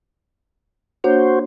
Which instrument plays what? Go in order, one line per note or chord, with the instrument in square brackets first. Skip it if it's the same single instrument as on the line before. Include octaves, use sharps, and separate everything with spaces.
[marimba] A#3 D4 C#5 [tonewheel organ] F#4 C5